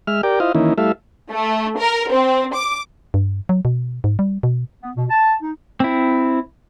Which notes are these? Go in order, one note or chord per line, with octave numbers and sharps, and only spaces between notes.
G#3 E5 F6
G4 A#4 D5 G5
E4 F4 C5 D#5 F5
D#3 E3 A#3 C#4 D#4 E4
G3 A3 E4 A4 E5 F5
A3
A#4
C4
D6
G2
F#3
B2
G#2
G3
B2
B3
B2
A5
D#4
C4 E4